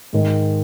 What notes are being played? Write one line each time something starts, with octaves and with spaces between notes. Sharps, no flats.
G#2 D#3 G#3